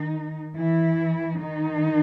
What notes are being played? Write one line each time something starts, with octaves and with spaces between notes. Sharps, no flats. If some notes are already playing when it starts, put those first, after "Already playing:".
Already playing: D#3 D#4
E3 E4
D#3 D#4